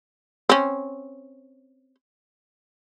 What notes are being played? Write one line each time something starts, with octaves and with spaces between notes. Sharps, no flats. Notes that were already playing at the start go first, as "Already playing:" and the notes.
C4 C#4